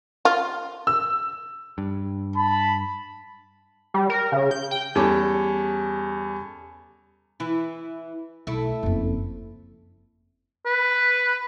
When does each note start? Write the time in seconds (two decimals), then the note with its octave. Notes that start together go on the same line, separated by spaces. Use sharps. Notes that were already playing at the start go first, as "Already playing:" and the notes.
0.25 F4
0.87 E6
1.78 G2
2.37 A5 B5
3.94 G3
4.10 A#4
4.32 C#3
4.51 G6
4.71 G5
4.95 E2 G3 C#4 A4 D6
7.40 E3 E4
8.47 B1 A3 E4
8.83 F#1 F2
10.66 B4